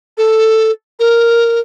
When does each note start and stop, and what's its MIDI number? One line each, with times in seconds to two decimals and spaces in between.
0.18 0.72 69
0.99 1.60 70